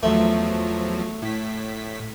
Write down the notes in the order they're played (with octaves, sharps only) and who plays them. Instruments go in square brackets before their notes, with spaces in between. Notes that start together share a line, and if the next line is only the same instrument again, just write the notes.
[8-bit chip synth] E2 F3 F#3 [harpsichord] A3
[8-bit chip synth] A2 B6